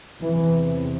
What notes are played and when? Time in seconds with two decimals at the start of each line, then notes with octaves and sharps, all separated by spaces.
0.21 E2 C3 E3